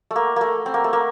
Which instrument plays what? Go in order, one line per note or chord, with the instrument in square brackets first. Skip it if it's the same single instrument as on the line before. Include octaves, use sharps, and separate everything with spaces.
[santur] A3
A#3
A3 A#3
C4
A#3
A3
A#3